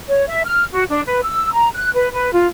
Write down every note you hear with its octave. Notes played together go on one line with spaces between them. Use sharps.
C#5
E5
F6
F#4
D4
B4
E6
A#5
F#6
B4
B4
F4